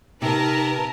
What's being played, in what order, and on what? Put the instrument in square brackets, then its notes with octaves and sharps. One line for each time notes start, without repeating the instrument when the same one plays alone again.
[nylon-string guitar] C3 [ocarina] D#4 [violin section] A#4 B4 A5